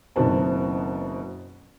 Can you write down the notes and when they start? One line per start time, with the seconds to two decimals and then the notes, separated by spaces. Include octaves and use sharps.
0.16 F#1 F#2 B2 D#3 C4 A5